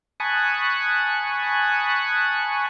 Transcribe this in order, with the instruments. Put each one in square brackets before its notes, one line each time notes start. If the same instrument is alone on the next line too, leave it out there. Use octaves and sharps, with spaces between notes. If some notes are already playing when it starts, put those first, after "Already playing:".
[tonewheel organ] G#5 A5 B5 C#6 D#6 F#6